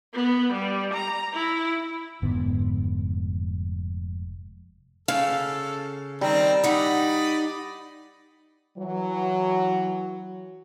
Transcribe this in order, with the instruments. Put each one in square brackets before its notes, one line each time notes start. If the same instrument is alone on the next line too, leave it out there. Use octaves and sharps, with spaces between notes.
[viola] B3
G3
A#5
E4
[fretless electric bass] F1 G#2 D3 B3
[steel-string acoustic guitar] C#3 [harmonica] A4 [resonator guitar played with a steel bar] F5
[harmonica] D#3 C4 A#5 [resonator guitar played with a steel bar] G3
[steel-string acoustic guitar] D#4 F#5 [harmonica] D5 D#5 B5
[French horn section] E3 F#3